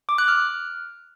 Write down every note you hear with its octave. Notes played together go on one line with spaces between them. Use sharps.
D6
F#6
F6